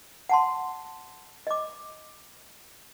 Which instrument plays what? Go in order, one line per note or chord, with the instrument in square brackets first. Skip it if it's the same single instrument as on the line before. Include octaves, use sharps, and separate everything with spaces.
[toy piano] F#5 A5 C6
D#5 D6